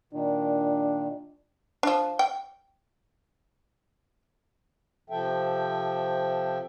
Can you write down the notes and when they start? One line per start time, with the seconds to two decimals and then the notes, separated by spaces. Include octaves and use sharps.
0.13 A#2 D#3 D4
1.83 F3 D4
2.19 G5
5.10 C3 F3 A4 E5 G5